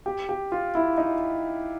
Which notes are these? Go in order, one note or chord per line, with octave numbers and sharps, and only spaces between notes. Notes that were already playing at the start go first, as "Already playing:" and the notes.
G4
G4
F4
E4
D#4